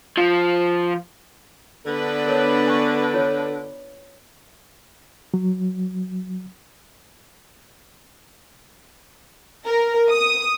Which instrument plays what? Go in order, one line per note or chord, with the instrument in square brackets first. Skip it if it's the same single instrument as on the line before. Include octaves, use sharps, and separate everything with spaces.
[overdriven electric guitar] F3
[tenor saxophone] D3 [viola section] B3 D4 B4
[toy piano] A4 A#4 C#5
G#5 C#6
F4 C#5
[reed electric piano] F#3
[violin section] A#4
D#6